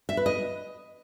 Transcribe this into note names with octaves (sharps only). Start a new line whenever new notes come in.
E5
B4
D#5